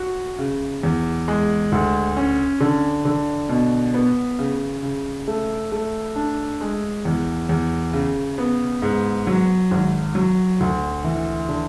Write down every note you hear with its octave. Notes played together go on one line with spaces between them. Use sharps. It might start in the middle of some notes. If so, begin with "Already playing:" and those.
Already playing: F#4
C#3
E2
G#3
D2
C#4
D3
D3
B2
B3
C#3
C#3
A3
A3
D4
G#3
E2
E2
C#3
B3
G#2
F#3
G#1
F#3
D2
E3
D3